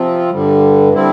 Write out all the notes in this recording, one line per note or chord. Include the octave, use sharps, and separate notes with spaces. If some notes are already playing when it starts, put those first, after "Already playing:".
Already playing: C3 F3 C4 F4
G2 D3 G3
D3 G3 C4 E4